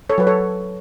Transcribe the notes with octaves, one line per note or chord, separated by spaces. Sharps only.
A4 C#5
F#3 B4
A4 C#5